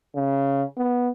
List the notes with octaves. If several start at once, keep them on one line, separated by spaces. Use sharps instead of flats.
C#3
B3